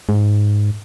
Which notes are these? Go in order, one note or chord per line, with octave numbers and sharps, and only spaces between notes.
G#2